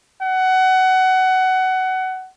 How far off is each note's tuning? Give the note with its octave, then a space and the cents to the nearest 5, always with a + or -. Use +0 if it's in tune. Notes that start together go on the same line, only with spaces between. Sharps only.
F#5 +20